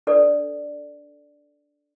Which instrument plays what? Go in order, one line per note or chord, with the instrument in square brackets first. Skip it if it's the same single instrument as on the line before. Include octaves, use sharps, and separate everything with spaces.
[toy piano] D4 A4 B4 D5